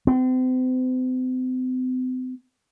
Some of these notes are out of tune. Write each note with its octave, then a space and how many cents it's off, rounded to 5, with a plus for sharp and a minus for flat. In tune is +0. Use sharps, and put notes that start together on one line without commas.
C4 -40